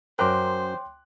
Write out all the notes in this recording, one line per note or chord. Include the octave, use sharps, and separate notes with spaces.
F#2 A#4 C5 C#5 G5 C6 D6 F#6